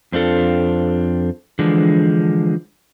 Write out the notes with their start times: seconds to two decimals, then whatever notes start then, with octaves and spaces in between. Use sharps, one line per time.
0.12 F2 C4 D4 F4 A4
1.59 D3 E3 F3 G#3 D4